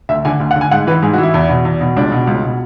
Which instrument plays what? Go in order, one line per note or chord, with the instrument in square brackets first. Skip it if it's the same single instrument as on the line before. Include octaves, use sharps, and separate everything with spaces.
[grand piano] D2 E5
D3 G#5
D2
F#5
D3
G#5
G#2 F#5
E3 B4
G#2 G#4
F#4
E3
E4
E2
B2
E2
B2
C#2 D4
B2
C#2
B2